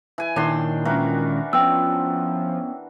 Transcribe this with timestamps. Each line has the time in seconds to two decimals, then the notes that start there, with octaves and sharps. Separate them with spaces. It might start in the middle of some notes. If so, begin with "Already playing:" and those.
0.18 E3 G#5
0.36 A#2 D#3 D4 E4 A#4 C#5 G5 C6
0.85 E3 G#3 C#4 F#4 A#4
1.53 F3 B3 C#4 G5 E6